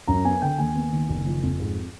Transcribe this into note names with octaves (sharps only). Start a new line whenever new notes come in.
F#2 A#5
B3 G#5
D3 G5
D#2 G#5
B3
D#3
F#1
F3
F2
G#2